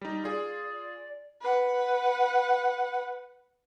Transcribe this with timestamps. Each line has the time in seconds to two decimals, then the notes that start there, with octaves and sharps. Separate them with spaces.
0.01 G3 D#4
0.24 F4 G#4 D5
1.41 B4 F#5